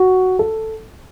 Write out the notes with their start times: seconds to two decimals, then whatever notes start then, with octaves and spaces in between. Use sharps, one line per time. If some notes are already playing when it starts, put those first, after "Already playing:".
Already playing: F#4
0.39 A4